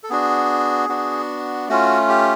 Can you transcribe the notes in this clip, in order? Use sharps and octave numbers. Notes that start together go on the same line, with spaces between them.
A4
B3 D4 F#4 G#4
B3 D4 F#4
A3 C#4 F4 F#4
G4